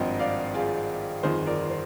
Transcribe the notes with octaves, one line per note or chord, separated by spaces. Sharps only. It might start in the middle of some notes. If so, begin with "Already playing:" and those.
Already playing: G#1 G2 F3 C4 D#5 G5
D5 F5
F4 G#4
G1 F2 D#3 G#4 C5
A#4 D5
C5